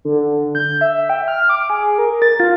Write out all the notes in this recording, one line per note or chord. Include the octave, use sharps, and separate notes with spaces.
D3
G6
E5
G5
F6
D6
G#4
A#4
A6
F4